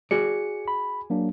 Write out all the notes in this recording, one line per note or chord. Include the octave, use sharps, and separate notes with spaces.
F#4 G#4 D5 C#7
B5
F#3 A#3 D4